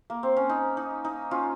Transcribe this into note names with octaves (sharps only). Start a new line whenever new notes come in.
A#3
C4
C#4
D#4
D#4
D#4
C#4 F4